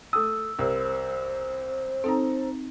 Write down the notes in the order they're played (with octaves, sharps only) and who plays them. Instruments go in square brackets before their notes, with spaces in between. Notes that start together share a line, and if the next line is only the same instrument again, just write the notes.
[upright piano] A3 D#6 [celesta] E6
[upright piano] C2 [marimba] A#4 [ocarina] C5
[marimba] C4 D#4 [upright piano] A4 A#5